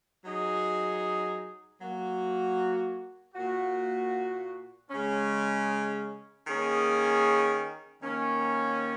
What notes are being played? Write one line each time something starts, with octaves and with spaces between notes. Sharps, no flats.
F#3 D#4 G#4
F#3 A#3 F#4
A#2 A#3 F#4
C#3 G#3 C#4
D#3 A#3 C#4 G#4
D#3 A#3 C#4